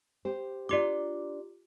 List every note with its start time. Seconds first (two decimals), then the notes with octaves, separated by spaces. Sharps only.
0.25 G4 C5
0.69 D4 F4 G4 D5 D6